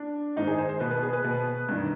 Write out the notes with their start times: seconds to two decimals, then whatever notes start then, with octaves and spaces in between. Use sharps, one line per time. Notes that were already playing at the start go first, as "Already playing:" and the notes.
Already playing: D4
0.36 G#2 D#3 D#4
0.47 G#4
0.58 C5
0.69 C5
0.80 B2 B4
0.91 B4
1.03 G#4
1.13 B4
1.24 B2
1.69 G2 D#3